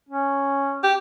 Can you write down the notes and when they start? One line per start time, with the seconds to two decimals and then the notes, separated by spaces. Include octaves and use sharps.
0.09 C#4
0.83 G4